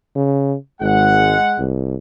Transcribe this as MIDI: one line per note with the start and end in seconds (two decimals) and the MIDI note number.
0.16 0.55 49
0.81 1.35 32
0.81 1.63 56
0.81 1.63 78
1.58 1.96 36